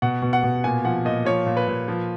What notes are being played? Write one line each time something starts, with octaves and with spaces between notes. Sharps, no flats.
B2 F#5
B2
F#5
B2
A#2 G#5
F3 F#5
A#2 D#5
F3 C#5
A#2
B4
A#2
F3